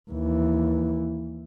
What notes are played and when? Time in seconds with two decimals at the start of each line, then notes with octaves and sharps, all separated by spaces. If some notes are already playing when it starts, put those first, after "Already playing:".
0.11 D#2 E3